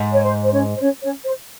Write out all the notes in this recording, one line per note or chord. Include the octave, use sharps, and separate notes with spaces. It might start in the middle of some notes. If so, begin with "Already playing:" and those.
Already playing: G#2
C#5
C5
C5
C#4 C#5
C5
C#4 C#5
C#4 C#5
C5